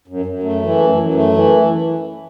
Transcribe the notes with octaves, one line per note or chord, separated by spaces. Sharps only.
F#2
F#2
A3
E3
F#2
F#2
A3
E3